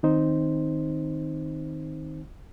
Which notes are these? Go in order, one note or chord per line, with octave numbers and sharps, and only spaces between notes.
D#3 C4 D#4 C5